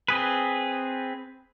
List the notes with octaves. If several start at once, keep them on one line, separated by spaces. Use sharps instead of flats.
C4 G#4 B4